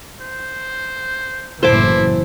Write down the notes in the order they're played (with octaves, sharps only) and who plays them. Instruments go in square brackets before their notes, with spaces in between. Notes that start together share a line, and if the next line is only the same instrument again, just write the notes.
[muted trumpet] C5
[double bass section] F#1 A2 E3 [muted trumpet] E4 [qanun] C5 A5 D6